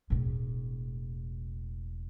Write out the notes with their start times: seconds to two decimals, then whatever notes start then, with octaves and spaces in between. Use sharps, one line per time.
0.10 E1 A2